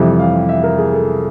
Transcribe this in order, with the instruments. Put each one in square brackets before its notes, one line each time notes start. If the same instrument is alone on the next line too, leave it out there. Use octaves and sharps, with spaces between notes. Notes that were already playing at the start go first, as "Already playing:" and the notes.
Already playing: [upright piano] F2 C3 E3 G3 E5
F5
E5
A#4
G#4
A4